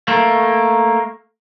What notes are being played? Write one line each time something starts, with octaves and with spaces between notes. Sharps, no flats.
A3 A#3